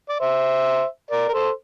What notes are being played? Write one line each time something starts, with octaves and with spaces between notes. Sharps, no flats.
D5
C5 E5
A#4 D5
A#4
A4 C5